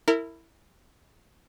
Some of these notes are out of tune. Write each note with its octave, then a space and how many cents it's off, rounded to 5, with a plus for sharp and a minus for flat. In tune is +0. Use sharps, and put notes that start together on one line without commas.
E4 +0 A#4 -30